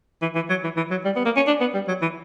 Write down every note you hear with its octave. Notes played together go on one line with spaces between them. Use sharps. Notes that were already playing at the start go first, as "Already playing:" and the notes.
E3
E3
F#3
E3
E3
F#3
G3
B3
A#3
C#4
D4
B3
G3
F#3
E3